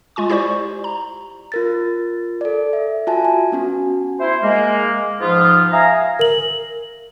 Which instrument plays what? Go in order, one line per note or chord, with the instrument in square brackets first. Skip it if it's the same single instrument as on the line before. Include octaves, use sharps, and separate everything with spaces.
[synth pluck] G#3 F4 G#5 C#6
E4 G4 C5 D5 C#6
A#5
[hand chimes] F4 A#4 A6
A4 D5
E5
F4 F#4 E5 G#5 A5
G#5
B3 C#4 F#4
[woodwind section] E4 C5
G#3 A#3
G#2 F3 B3 F4
E5 F5 G#5 A#5
[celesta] A#4 F#7